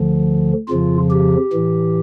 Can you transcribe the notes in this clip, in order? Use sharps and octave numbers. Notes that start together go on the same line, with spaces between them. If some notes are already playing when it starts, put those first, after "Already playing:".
Already playing: D2 D3 F3
F2 C#3 F3 F4
G4
A2 E3